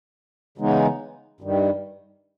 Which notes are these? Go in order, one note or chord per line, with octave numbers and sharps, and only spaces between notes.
C#3 E3 G#3 B3 D#4
G2 D#3 G3